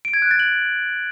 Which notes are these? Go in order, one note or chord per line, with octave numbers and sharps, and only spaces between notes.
D7
G#6
F#6
A6
F#7